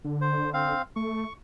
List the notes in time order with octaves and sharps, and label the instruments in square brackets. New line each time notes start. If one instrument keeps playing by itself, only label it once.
[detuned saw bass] D3
[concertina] C5
[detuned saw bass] D3
[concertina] C4 F5
[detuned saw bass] A3 [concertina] C#6